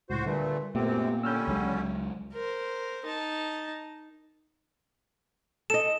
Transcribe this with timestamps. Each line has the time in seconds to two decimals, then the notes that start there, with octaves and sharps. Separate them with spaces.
0.10 C#2 A2 F#4 C5
0.25 A#2 D3 G3 A3 B4
0.75 F#2 A#2 A3 B3 C4 G4
1.23 D3 G3 C#4 E6 F6 G6
1.48 C#2 F#3 G#3
2.33 A#4 C5
3.05 D#4 A5
5.70 A4 D#5 E7